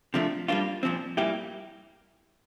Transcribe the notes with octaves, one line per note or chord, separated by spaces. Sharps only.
C3 F3 A3 D4
G3 A#3 D4 F4
A#2 F3 C4
A#2 G3 A#3 E4 G4